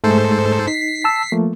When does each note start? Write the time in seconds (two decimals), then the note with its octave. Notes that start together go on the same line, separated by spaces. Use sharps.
0.04 G#2 G#3 A3 A4 C5
0.67 D#4 B6 C7
1.04 A5 E6
1.32 F3 A3 A#3